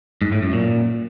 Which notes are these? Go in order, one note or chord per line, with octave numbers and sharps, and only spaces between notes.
G#2
A2
F#2
A#2